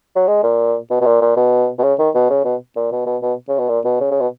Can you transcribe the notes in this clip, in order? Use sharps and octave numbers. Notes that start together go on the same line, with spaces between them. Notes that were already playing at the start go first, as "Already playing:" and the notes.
F#3
G#3
A#2
B2
B2
A#2
A#2
B2
B2
C#3
D#3
B2
C#3
B2
A#2
B2
B2
B2
C#3
B2
A#2
B2
C#3
C#3
B2